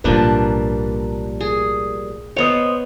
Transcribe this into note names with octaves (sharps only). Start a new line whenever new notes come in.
B1 A2 F3 G3 A#3 D4 A#4 B4
G#4
B3 C5 C#5 D#5